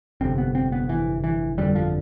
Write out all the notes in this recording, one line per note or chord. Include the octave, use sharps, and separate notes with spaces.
G1 F2 C3 C4
B3
C4
B3
E3
E3
G1 F2 D3 G3
F3